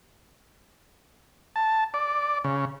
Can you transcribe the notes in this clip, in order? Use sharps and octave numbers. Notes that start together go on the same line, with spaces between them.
A5
D5
C#3